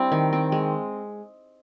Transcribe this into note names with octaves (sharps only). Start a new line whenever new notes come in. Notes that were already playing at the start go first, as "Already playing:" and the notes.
Already playing: G3 C4 D4 E4
D#3
C4
G#3